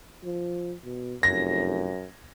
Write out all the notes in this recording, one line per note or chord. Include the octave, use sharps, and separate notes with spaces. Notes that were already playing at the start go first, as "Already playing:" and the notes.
F3
B2
F1 F#2 A#6